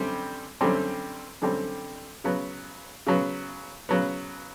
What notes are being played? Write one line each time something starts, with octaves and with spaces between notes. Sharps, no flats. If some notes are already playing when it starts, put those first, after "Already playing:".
Already playing: F#2 D3 G3 C4
F#2 D3 G3 C4
F#2 D3 G3 C4
C#3 F#3 B3
C#3 F#3 B3
C#3 F#3 B3